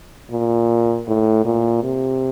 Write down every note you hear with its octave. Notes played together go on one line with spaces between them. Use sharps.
A#2
A2
A#2
C3